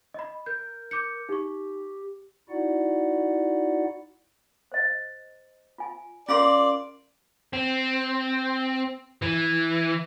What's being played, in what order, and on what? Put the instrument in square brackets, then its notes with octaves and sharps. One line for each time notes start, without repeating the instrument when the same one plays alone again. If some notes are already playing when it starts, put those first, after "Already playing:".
[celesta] D#5 B5
[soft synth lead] A#4 [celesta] G6
[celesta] D6 G6 C#7
[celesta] D#4 C#6 [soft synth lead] G4
[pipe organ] D#4 E4 F#4 D5 F#5
[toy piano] C5 D#5
F4 G#5
[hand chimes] C#4 F5 C6 [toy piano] F4 G#4 A#4 [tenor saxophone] D5
[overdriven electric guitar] C4
E3